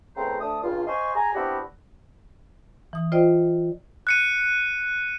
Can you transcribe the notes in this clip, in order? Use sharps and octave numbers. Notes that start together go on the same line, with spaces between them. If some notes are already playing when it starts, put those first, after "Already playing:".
E2 C#3 A3 C4 C5 A#5
D2 A3 D4 D#6
C#2 G2 F4
C5 D#5 F5 G#5 C6 C#6
G#4 G#5 A#5
B3 C4 D4 E4 F#4 G4
E3 D#6
F4 C5 D5 D#5 G5
F#6 C#7 D#7